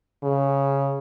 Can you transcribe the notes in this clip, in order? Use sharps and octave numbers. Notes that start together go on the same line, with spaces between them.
C#3